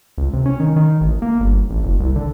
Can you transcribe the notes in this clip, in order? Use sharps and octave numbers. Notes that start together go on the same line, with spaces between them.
C#2
C3
C#4
D#3
D#3
A1
A#3
G1
A1
F#1
C2
D3